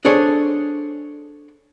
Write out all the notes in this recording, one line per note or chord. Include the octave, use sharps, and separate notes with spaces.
D4 G#4 A4 C5 C#5